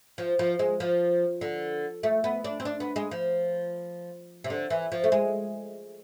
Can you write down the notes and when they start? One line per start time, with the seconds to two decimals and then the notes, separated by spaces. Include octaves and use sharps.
0.18 F3
0.39 F3
0.59 G#3
0.80 F3
1.41 D3
2.03 A3
2.24 B3
2.44 D4
2.60 C4
2.65 D4
2.80 B3
2.96 G#3
3.11 F3
4.44 C3
4.50 D3
4.70 E3
4.92 F3
5.04 A3
5.12 G#3